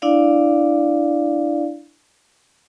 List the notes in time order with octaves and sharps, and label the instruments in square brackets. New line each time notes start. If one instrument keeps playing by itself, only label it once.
[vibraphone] D4 E4 D5 F5